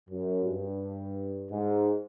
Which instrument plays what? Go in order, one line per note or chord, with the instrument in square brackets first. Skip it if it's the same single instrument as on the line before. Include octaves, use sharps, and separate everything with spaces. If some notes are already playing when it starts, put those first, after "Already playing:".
[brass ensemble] F#2
G2
G#2